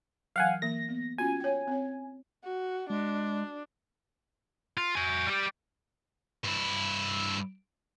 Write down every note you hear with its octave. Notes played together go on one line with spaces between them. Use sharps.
E3 F#3 F5 F#5 G#5
E3 A#3 A#6
B3
C#4 F4 F#4 G#5
C#5 G5
C4 C#5
F#4
G#3 D4
F4
F#4 G#5
G3 G4
G2 E4